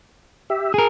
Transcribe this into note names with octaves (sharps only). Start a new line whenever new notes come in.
G4 E5
G#4 A#4